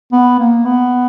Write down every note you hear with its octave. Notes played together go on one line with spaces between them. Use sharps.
B3
A#3
B3